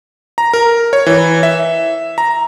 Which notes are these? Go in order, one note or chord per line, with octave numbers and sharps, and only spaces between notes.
A#5
A#4
C#5
E3
E5
A#5